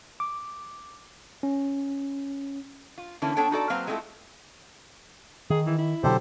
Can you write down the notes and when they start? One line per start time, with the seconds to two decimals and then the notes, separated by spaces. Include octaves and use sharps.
0.20 D6
1.43 C#4
2.98 F4
3.22 D3 E3 A#3 C#4 E4
3.36 B3 D4 A4 C#5 G5
3.51 D#4 F#4 A4 D5
3.70 F#3 A#3 C4 B4 C5 F5
3.87 G#3 A3 C4 E4 F4 A4
5.50 D#3 G#4
5.66 E3
5.78 E4
6.03 B2 D3 F#3 G4 A4 C5